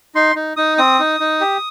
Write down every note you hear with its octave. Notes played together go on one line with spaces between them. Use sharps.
D#4 C6
D#4
D#4 D#6
C4 D#6
D#4
D#4
G4